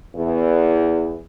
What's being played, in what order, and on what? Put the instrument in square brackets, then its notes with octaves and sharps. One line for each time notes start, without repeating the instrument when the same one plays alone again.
[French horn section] E2